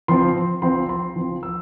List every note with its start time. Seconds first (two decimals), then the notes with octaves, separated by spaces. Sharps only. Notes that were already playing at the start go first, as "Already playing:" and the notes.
0.08 F3 C4 C6
0.62 F3 C4 C6
0.89 C6
1.16 F3 C4
1.43 E6